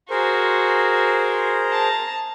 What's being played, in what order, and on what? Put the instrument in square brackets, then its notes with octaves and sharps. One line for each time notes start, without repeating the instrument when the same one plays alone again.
[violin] F#4 [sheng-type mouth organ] G#4 A#4 C5
[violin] A5 A#5